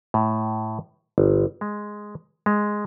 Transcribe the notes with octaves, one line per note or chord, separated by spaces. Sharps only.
A2
G1
G#3
G#3